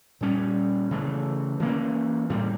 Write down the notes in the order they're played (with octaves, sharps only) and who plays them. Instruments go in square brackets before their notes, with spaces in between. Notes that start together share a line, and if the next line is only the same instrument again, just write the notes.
[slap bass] A#2 G3 C#4
C#3 E3 A3
E3 A#3 C#4
A2 G3 A#3